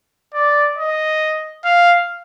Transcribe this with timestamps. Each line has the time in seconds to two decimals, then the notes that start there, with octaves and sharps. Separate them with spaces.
0.34 D5
0.78 D#5
1.65 F5